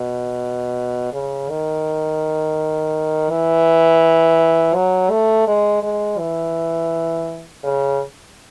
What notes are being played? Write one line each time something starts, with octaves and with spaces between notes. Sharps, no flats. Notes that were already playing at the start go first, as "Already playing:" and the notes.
Already playing: B2
C#3
D#3
E3
F#3
A3
G#3
G#3
E3
C#3